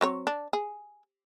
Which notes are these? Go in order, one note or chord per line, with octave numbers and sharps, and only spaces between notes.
F#3 C4 C#5
D4
G#4